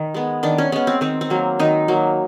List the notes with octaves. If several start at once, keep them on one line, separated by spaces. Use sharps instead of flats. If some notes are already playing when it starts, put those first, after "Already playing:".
Already playing: D#3
G#3 B3
D#3 D4
C#4
G#3 B3 C#4
C4
D#3 C4
C4
F#3 A#3
D#3 D#4
F#3 A#3